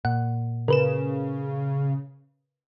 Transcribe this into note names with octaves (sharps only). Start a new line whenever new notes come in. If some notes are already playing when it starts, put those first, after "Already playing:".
A#2 F#5
C#3 A#4 B4 E7